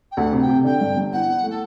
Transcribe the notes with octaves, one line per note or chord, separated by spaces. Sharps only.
G5
D2 F#5
C3
G5
C3
D3 G5
G2
G1
E4 F#5
E4
A3
A4